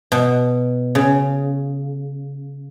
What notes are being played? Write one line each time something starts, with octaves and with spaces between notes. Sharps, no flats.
B2
C#3